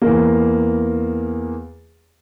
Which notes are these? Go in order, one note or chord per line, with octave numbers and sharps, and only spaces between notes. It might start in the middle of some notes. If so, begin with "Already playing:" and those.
E2 A#3